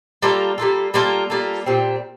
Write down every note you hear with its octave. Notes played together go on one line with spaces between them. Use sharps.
G3 A#3 F4 A4
G3 A#3 F4 A4
G3 A#3 F4 A4
G3 A#3 F4 A4
A#2 G3 C4